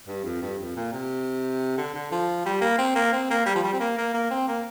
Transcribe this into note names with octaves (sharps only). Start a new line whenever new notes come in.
G2
F2
G2
F2
A#2
C3
D3
D3
F3
G3
A#3
C4
A#3
C4
A#3
G3
F3
G3
C4
A#3
A#3
A#3
C4
A#3